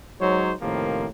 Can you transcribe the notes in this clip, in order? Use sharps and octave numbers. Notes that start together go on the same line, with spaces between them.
F#3 G#3 D#4 C5 C#5
A2 C3 D#3 F3 A#3